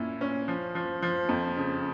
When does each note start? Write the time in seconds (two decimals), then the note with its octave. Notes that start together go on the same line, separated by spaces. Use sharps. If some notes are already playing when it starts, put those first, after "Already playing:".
Already playing: A#2 C#4 E4
0.21 C#4
0.48 F3
0.75 F3
1.02 F3
1.29 F2
1.56 C#3